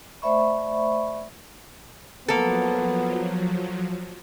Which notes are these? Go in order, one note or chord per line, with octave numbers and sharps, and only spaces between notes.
A3 C5 D5 E5 B5 C#6
F3 F#3 A#3 B3 A4